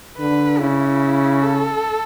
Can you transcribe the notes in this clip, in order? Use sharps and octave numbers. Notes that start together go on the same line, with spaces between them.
D3 B4
C#3 E4
A4